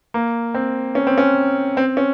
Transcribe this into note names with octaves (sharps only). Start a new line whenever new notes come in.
A#3
C4
C#4
C4
C#4
C4
C#4